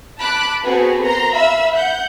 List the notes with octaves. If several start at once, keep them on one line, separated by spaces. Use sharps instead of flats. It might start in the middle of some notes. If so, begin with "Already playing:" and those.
A5 B5 D6 F#6
B3 C4 F#4 G#4 A4 B4
A#4 A#5 C6
E5 F5 B5 E6
F#5 G6